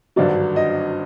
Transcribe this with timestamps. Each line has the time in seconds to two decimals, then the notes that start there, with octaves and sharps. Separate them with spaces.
0.16 G#1 G2 D3 F#3 D5
0.56 D#5